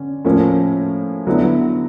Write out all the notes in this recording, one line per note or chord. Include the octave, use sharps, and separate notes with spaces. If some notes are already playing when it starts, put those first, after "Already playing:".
Already playing: D3 C#4
A2 F3 A#3 C#4
D3 F#3 B3 E4